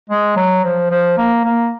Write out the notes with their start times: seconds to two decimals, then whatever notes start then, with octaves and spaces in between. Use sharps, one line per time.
0.10 G#3
0.36 F#3
0.64 F3
0.90 F3
1.17 A#3
1.45 A#3